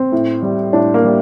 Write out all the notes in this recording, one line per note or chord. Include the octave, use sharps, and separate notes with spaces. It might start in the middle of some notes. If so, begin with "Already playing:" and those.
Already playing: C4
A2
G3
A2 D4
A#3
G3